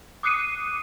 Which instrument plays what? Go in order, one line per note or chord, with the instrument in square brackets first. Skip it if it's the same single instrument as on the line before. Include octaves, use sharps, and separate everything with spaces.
[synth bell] D6 D#6 F#6 C7 C#7 D#7